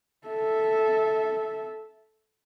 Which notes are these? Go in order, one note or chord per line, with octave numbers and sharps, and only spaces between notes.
A4 E5